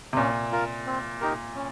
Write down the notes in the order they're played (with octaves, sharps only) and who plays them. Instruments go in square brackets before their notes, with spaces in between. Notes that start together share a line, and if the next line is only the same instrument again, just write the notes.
[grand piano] C3
[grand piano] A#2 [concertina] C#4
[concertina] F4 A#4
C4
D#4 G4 A#4
C#4